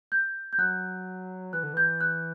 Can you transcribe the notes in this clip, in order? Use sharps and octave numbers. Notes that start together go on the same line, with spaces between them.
G6
G6
F#3 F#6
E3 F#6
D3
E3 G6
F#6